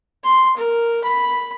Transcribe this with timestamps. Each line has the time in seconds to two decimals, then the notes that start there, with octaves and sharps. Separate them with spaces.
0.24 C6
0.57 A#4
1.04 B5